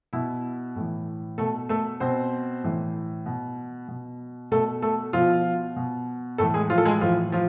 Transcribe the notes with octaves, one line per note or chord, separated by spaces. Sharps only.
B2 E4
A2 E3
B2 A3 A4
A3 A4
B2 C4 C5
A2 E3
B2
B2
B2 A3 A4
A3 A4
B2 F3 F4
B2
A2 E3 A3 A4
G#3 G#4
F3 F4
A4
G#3 G#4
A2 E3 F3 F4
F3 F4